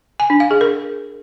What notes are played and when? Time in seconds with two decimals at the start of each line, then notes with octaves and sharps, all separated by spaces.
0.20 G#5
0.30 D4
0.40 F5
0.51 G#4
0.61 A#4